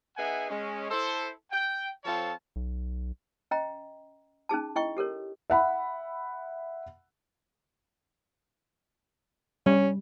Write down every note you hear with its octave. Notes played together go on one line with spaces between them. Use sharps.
B3 D#4 G#4 E5 F#5 G#5
G#3 C#4
E4 A4 C5
G5
F3 C4 F4 A4 C#5 A5
B1
C#4 D#5 G5 A#5
C#4 D#4 G#4 A5
E4 D#5 G5 C#6
G4 A4 A#4 C#5
E5 F#5 B5
G3 C#4